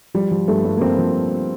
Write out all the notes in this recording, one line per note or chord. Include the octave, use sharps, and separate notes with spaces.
F3 G3
F3
G2 A3
G2
A#3
F3 C4
F3